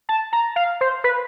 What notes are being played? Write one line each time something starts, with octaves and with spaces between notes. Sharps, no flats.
A5
A#5
F5
C5
B4